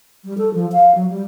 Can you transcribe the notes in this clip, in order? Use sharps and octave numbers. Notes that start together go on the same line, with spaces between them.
G3
A4
F3
F5
F#3
G3